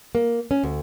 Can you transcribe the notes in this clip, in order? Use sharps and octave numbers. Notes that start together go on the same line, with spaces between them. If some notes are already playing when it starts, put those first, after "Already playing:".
A#3
C#4
D2